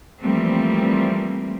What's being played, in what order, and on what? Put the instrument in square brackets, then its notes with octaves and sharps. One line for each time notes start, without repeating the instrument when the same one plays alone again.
[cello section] E3 F3 G3 A3 A#3 C4